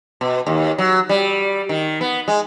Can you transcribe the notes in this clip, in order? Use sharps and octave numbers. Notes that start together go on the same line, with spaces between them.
B2
D#2
F#3
G3
D#3
B3
G#3